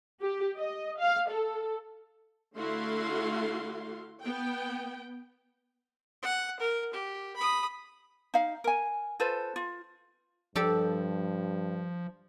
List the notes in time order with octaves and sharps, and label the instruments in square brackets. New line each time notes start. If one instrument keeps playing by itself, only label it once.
[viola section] G4
D#5
F5
A4
D3 A3 E4 F#4 F5 C6
B3 G5
[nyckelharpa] F#5
A#4
G4
B5 D#6
[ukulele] D#4 F5
A#4 G#5
F4 A4 B4 C5
F4
[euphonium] G2 [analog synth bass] F3 [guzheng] G4 A4 D5